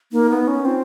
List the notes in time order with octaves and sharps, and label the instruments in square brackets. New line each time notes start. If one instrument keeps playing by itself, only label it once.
[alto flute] A#3 [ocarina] D#4
[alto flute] B3
C#4
[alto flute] C4 [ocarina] F4